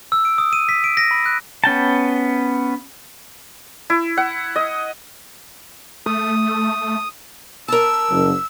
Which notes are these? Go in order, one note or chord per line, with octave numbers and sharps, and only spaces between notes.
E6
D7
D#6
D#7
B6
D7
A#6
B5
F#6
B3 C#4 G5 A5
E4
F#5
D#5
A3 D#6
A#4 A5 E6
F#1